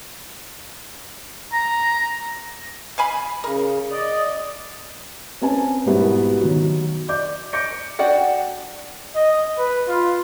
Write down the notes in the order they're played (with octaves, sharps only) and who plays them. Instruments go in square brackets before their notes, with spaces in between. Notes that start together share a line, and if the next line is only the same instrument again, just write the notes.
[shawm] A#5
[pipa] F5 G#5 B5
[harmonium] C#3 [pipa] A#4
[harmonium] D5 D#5
[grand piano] C4 C#4 B4 G#5 A5
G#2 B2 G3 B3 E4 F#4
D#3 F#3
D5 D6 G6
D6 G6 A#6 C#7 D7
[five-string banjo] D4 F#4 D5 F#5 G5
[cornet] D#5
B4
F4